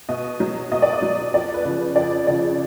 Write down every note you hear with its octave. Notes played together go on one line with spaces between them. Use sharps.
B2 D#5
F#3
B2 D#5
D5
D#5
F#3
F2 D5
B4
C#3 F3
F2 D5
C#3 F3 D5